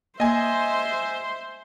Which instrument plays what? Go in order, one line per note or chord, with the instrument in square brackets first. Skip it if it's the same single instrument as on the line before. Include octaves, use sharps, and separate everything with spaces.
[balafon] A#3 [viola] C5 C6 [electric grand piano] D#5 G#5 [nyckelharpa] E5